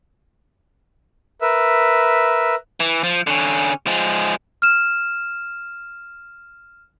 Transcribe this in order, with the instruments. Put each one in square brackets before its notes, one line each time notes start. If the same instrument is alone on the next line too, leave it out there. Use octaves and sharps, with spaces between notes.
[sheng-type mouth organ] A#4 B4 E5
[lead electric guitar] E3
F3
D3 C#4
F3 G#3
[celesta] F6 E7